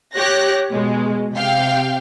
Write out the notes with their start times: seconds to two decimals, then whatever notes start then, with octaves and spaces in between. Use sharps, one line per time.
0.15 G4 C#5 F#6 A#6
0.71 B2 G#3
1.34 C3 F5 G5